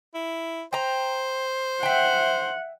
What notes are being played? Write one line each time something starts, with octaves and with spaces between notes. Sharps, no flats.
E4
C5 G5 A#5
E5 F#5 G5